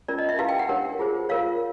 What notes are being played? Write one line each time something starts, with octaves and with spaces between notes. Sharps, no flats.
C#4 F4 A#4 D5
D#5
E5
E4 G4 B4 F5
G5
F#5
D4 G4 A#4 C#5
F4 G#4 C5
F4 A#4 C#5 F5